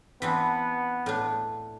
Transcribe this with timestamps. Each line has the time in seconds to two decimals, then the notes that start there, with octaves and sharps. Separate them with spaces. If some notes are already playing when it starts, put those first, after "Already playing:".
0.22 E3 B3 C4 D4
1.06 A2 D4